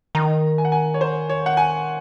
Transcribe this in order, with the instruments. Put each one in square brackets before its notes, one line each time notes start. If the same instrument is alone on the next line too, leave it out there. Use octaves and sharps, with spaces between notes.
[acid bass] D#3 [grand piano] A#5
[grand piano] G#5
F#5
G#5
C#5
C5
C#5
F#5
G#5